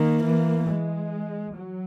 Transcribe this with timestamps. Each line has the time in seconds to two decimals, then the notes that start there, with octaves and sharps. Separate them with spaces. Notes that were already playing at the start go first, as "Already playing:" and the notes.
Already playing: D#3 A#3
0.24 E3
0.69 G#3
1.55 F#3